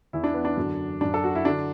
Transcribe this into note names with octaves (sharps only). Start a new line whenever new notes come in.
E2 E3 E4
D4
B3
D4
F#2 D3 F#3
F#2 F#3 D4
A4
F#4
E4
D3 F#3 D4